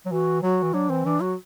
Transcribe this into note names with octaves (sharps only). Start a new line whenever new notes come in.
F#3
E3 F#4
F#3 F#4
E3
F#3 D4
E3 C4
E3 D4
F#3 F#4